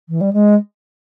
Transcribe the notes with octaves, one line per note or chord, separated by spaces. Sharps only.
E3
G3
G#3